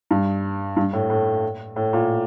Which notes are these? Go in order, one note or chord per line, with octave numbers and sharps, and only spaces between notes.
G2
G2
A2
A2
A2
A#2